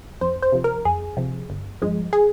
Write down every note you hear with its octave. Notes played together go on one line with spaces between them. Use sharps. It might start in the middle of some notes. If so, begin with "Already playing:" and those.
F2 C5
C5
C3 F3
A#4
F2 G#4
C3 F3
G1
G2 F3 G#3
G#4